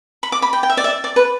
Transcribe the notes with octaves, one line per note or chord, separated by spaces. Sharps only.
B5
D6
B5
G5
G5
E5
D5
E5
D5
B4